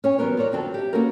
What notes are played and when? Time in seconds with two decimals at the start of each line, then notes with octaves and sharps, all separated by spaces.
0.04 C#4 C#5 G#5
0.18 E3 F#3 G3 B3 A#4 C5
0.37 F4 F#4 A#4 C#5 D5
0.52 F2 D3 C4 F#4 A4 A5
0.74 G4 E5
0.93 A#3 B3 C#4 F#4 A4 A#4